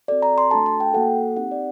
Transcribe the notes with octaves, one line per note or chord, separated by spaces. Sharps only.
C4 F#4 A4 D5
A#5
C6
A3 D4 F#4 A4 A5
A5
G5
A#3 F#4 A4 F#5
C4 D#4 G4 F#5
D5